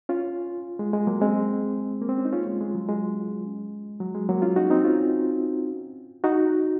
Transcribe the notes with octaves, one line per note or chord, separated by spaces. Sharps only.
C#4 F4
G#3
G#3
F#3 A#3
G#3 C4
A#3
C4
C#4
D#4
C#4 F4
G#3
G#3
F#3
G#3
F#3
G#3
F#3 A#3
C#4 F4
D#4 F#4
C4 D#4
C#4 F4
D#4 F#4